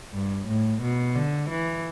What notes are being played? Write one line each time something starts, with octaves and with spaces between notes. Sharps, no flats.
G2
A2
B2
D3
E3